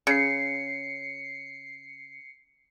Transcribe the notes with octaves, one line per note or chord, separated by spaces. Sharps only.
C#3 C7 C#7